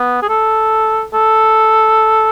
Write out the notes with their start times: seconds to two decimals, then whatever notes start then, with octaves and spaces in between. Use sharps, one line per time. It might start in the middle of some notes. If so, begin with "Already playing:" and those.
Already playing: B3
0.22 G#4
0.29 A4
1.14 A4